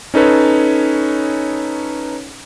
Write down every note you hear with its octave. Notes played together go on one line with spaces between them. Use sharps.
C#4 D#4 A4 B4 C#5